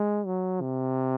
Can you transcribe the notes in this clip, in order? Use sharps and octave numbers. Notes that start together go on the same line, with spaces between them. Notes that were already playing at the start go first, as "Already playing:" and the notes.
Already playing: G#3
F#3
C3